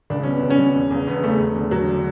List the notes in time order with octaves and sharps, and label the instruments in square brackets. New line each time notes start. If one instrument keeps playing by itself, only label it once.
[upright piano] C#2 D4
B2 C#4
B3
C#2
C#4
B2
E1
E2 C#3
E1 B3
E2 C#3 A3
E1
E2 D3
E1 F#3
D3